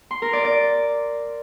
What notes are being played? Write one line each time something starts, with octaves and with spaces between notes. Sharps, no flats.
C6
A#4
D5
D5